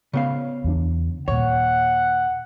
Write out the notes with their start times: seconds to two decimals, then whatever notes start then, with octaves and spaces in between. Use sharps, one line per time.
0.13 C#3 B3 F5
0.64 E2 E3 D4
1.28 D#2 A#2 C#5 F#5